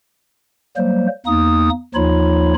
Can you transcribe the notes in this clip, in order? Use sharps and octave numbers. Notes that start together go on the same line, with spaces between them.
F#3 G3 A#3 C5
E2 A#3 D#4 D#6
D#2 F3 D#4 F4 C#5 B5